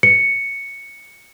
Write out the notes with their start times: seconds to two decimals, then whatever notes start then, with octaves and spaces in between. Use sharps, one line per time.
0.03 C#7